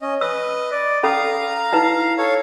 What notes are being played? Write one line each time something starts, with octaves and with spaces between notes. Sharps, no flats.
C#4 D#5
B4 D#5 E6
D5
C#4 A4 F5 A#5 B5
D#4 E4 B4
A4 C#5 F5